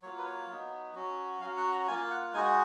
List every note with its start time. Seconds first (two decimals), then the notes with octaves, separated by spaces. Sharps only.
0.02 F#3 A#3 F4 C#5
0.18 B4
0.26 C#5
0.48 F#3 B3 D#4
0.95 F#3 C#4 F#4
1.41 F#3 C#4 F#4 F5
1.57 F#5
1.72 A#5
1.87 F4 G#5
1.90 A#3
2.10 F#5
2.33 G#3 D#4 F#4 G#5